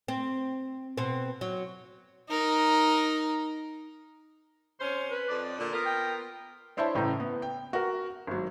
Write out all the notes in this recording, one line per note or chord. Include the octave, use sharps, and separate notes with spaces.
C4
B2 C4
F#3
D#4 A#4
C3 C#4 C5
B4
F2 D5
A#2 D3 A4
B3 F4 A#4
G5
D4 E4 C5 C#5 E5 A5
A1 A2 C#3 A#5
B3
G5
F#4 A#4
G#1 F#3